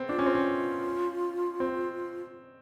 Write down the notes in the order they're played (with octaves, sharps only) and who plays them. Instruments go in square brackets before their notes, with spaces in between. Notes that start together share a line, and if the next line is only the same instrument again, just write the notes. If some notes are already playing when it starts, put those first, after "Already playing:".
Already playing: [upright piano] B3 C4
[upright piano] D4 [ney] F4
[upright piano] C#4
C4
C#4
C4